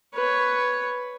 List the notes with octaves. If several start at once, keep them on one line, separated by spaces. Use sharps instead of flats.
B4 C#5